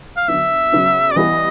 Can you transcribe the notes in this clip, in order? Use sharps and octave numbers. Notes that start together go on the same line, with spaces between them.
F5
D3 F#3 B3 E5
C#3 F#3 B3
D5
E3 G3 B3 D#5